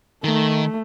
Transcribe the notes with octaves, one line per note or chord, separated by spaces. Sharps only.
D#3 A3